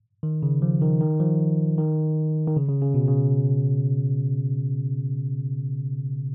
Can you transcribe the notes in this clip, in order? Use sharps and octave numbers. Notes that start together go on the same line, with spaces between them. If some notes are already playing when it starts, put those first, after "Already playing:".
D#3
C#3
F3
D#3
D#3
F3
D#3
D#3
C#3
C#3
C#3
B2
C#3